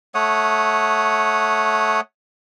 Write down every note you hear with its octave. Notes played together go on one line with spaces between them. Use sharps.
A3 C#5 F#5 D#6